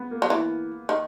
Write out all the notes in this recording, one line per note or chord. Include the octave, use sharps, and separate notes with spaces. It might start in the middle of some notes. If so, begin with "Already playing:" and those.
Already playing: B3
A#3
F#3
E3
D#3